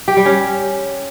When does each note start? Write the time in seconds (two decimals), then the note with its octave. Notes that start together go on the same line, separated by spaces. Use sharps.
0.08 G4
0.17 G3
0.25 C#4